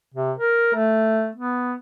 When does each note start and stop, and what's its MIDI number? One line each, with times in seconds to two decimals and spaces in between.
0.14 0.32 48
0.38 0.73 70
0.74 1.30 57
1.35 1.75 59